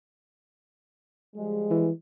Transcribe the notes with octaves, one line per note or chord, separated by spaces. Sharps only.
F3 G3 G#3
E3